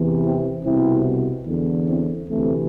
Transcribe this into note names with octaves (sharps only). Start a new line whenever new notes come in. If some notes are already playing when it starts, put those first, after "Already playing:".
Already playing: E2 C3 E3
C4 E4
C2 B2 C4 E4
E2 D3
C4 E4
D2 C3 E3 A3 C4